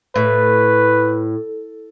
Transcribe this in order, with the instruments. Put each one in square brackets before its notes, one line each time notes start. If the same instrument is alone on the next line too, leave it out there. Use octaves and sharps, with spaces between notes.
[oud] A2 [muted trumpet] B4